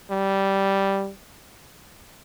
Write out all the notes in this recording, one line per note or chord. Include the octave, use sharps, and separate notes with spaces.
G3